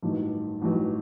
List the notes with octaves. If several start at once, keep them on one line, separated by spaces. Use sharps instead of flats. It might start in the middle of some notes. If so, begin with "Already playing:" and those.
A1 G2 D#3 F#3
A1 G2 D#3 F#3